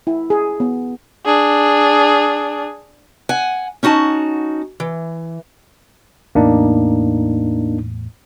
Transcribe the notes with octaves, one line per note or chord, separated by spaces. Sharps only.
E4
G#4
B3
D4 G#4
F#5 G#5
C#4 D#4 F#4 G#5 A5
E3
E2 A2 A#3 B3 D4 D#4